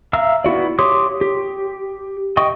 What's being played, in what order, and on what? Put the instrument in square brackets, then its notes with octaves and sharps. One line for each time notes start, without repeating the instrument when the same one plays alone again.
[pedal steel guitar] E5 F5 A#5 E6 F6
B3 E4 F#4 D5
G4 C#5 C6 D6 D#6
G4
D#5 G5 C#6 D#6